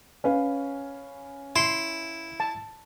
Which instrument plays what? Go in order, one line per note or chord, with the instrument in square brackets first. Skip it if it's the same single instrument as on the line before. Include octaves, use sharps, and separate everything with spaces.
[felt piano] C#4 B4 F5
[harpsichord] E4 [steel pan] C6
[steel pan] A5